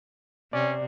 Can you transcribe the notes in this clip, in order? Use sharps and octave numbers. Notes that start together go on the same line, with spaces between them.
C3 C#4 D5